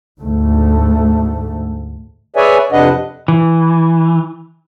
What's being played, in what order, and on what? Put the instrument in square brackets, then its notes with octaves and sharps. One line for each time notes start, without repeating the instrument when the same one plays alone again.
[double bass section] D2 G#2 A3
[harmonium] G#4 B4 C#5 D5 E5 G#5
F2 C3 D4 B4 D#5 F#5
[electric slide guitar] E3